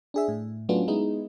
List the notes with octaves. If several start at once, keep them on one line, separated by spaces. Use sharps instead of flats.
D4 G#4 E5
A2
F#3 A3 B3 C#4 D4 F4
G#3 B3 D#4 E4